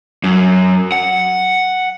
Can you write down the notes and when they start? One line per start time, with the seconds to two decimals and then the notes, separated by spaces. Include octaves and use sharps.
0.24 F#2
0.92 F#5